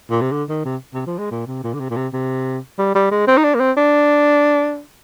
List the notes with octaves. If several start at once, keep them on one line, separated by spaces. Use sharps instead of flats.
A#2
C3
D3
D#3
C3
C3
F3
G#3
A#2
C3
A#2
D3
C3
A#2
C3
C3
G3
G3
G#3
C4
D#4
D4
A#3
C4
D4